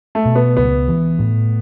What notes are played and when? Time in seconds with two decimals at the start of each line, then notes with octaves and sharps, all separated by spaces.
0.15 A3
0.25 B2
0.35 B3
0.57 C#2 B3
0.88 E3
1.19 A2